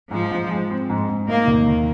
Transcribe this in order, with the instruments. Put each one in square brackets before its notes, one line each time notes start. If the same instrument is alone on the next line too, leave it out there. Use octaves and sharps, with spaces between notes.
[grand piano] G#2 [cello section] F3
[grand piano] G#2
G#3
C4
G#2
G#2
[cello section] A#3 [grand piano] D#4
[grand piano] D#2
D#3